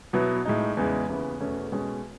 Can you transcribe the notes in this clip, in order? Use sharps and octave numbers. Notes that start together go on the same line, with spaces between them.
B2 F#3 B3 E4
A2 G#3 D#4
E2 C#3 E3 G#3
D#2 C#3 E3 B3
E2 B2 A3 C#4
B2 G#3 C#4